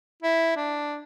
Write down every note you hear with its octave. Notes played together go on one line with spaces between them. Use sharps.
E4
D4